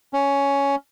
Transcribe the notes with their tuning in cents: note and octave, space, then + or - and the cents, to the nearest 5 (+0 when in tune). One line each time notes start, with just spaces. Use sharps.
C#4 +10